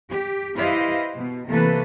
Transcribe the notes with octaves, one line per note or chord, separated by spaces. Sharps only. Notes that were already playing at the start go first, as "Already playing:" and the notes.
G4
E4 G4 B4 C5 D#5 F5
B2
C3 E3 A3 A#3 A4 B4